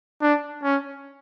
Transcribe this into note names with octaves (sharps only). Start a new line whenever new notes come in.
D4
C#4